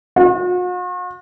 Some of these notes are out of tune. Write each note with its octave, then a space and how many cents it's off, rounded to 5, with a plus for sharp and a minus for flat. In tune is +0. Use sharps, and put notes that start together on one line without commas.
F#4 -45